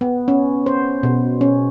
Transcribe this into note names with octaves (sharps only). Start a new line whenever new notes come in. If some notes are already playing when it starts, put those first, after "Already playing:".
B3
C#4
C5
B2
C#4